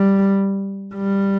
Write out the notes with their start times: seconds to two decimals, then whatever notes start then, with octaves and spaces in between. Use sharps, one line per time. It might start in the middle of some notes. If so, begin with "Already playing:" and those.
Already playing: G3
0.94 G3